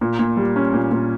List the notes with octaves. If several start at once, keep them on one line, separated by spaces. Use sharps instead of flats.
A#2
A#2
G3
C#4
A#2
A#2